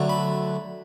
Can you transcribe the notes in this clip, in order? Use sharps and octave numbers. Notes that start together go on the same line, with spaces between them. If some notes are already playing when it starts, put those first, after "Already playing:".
Already playing: D2 D3 F#3 A3
B5